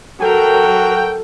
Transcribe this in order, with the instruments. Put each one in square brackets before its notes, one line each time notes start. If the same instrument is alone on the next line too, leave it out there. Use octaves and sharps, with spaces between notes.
[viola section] F#3 A#4 [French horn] F#4 [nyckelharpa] A4 [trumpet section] G5